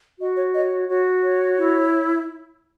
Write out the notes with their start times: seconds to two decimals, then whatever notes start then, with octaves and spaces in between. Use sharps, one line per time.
0.19 F#4 D#5
0.36 C#5
0.53 C#5 D#5
0.88 F#4 C#5
1.23 C#5
1.58 E4